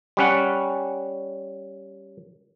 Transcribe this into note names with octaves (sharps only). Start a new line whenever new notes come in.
G3 C#4 F#5